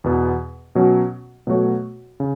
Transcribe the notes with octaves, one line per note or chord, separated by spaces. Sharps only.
E2 B2 B3
B2 F#3 C#4
B2 F#3 A3 F#4 C#5
C#3